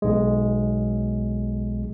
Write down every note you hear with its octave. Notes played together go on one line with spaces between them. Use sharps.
B1 G#3